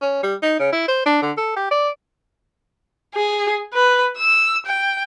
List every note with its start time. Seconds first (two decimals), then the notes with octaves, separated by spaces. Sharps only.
0.01 C#4
0.23 G3
0.42 D#4
0.59 C#3
0.72 E4
0.88 C5
1.06 D4
1.22 D3
1.37 A4
1.56 G4
1.71 D5
3.15 G#4
3.74 B4
4.17 E6
4.66 G5